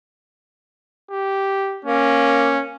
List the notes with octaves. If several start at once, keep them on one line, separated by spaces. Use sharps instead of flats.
G4
A#3 C#4